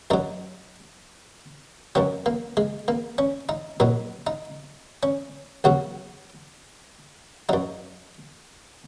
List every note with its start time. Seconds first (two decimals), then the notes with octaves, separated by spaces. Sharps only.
0.10 F#2 F#3 D#4
1.95 F#2 D#3 F#3 C#4
2.26 A#3
2.57 G#3
2.88 A#3
3.18 C#4
3.49 D#4
3.80 A#1 A#2 F#3 D#4
4.27 D#4
5.03 C#4
5.64 D#2 C#3 F#3 F#4
7.49 F#2 F#3 D#4